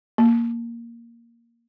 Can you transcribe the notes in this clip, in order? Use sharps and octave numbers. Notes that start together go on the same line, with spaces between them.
A#3